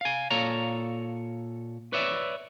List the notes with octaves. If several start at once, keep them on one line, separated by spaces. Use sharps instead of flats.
F5 G#5
A#2 A4 C#5 F5 A#5
B4 C#5 D5 E5